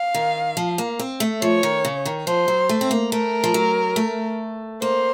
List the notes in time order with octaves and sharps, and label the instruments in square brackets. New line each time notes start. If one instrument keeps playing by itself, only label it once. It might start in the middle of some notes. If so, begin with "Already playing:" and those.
Already playing: [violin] F5
[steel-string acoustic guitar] D#3
F3
A#3
C4
A3
[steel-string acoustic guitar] F3 [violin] C#5
[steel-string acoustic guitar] D#3
C#3
D#3
[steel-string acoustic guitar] F3 [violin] C5
[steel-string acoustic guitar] F#3
A3
C4
A#3
[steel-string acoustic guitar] A3 [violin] A#4
[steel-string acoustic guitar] F3
F#3
A3
[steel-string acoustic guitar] A#3 [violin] C5